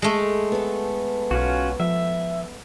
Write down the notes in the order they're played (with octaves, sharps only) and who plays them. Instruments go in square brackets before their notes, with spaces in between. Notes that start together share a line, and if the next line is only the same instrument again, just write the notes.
[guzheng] G#3 A3
[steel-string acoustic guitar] B3 A4
[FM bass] B1 [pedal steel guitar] C#4 F4 F#4
[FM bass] F3 [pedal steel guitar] E5